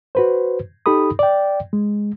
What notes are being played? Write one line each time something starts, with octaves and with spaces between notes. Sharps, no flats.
F#4 B4 C5
D#4 G4 A4 B5 D#6
D5 G5
G#3